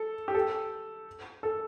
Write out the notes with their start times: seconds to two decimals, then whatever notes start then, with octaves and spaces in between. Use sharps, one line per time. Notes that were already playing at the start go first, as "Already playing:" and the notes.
Already playing: A4
0.28 G4
0.34 A4
1.43 A4